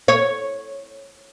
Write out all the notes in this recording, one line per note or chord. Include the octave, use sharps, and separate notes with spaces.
C#5